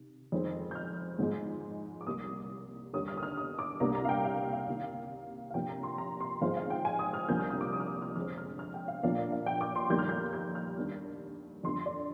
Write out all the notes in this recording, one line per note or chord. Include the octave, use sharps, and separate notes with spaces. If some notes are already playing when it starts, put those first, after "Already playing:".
Already playing: C3 D#3
F2 D#3 G#3 C4
G6
F6
G#2 F3 G#3
D6
C2 C3 G3 A#3 D#6
D#2 D3 G3 D#6
F6
D#6
F6
D#6
D6
C2 C3 G3 A#3 D4 A#5
A#5
F5
G5
F5
F5
C3 D#3 A#3
F5
C3 F3 A#3 D4 G5
A#5
C6
A#5
C6
G#2 F3 G#3 C4 F5
F5
G5
G#5
D#6
F6
C2 C3 F3 A#3 D4 G6
F6
D#6
D6
D#6
F6
D#6
F6
F2 D3 G#3 C4 F6
F6
F6
G5
F5
A#2 F3 A#3 D4 F5
D5
F5
G5
D6
C6
F2 D#3 G3 A#3 G6
F6
G6
G6
F6
D#2 D#3 G3 A#3 D4
F2 D3 F3 C6
D5